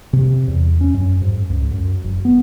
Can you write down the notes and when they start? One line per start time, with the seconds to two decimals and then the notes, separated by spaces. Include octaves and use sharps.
0.13 C3
0.48 E2
0.81 C#4
0.94 F#2
1.22 G#2
1.50 C#2
1.71 F#2
2.04 F#1
2.25 B3